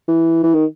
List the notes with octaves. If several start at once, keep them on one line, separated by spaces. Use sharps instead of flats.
E3
E3
D#3